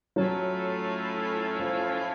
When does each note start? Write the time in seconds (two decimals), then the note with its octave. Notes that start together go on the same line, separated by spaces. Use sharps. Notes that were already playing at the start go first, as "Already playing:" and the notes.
0.16 A2 F#3 A3 C#4 F4 A4
1.59 F3